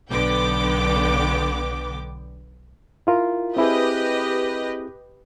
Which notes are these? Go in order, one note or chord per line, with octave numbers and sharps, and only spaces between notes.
B1 D3 B3 G5 D6
E4 F4 A#4
C4 E4 G4 G#4 B4 D#5